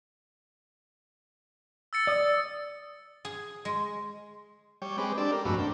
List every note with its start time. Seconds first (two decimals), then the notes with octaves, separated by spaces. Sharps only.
1.93 E6 A6 C#7
2.07 D5 D#6
3.25 G#4
3.65 G#3
4.82 G3 C#5 G5
4.98 G#3 C4 B4 D6
5.18 D4 G4 A4 D5
5.32 A#4
5.45 F2 G#2 A3 C4 F#4 B5
5.59 D4 G5